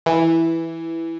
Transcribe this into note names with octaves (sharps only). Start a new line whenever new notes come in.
E3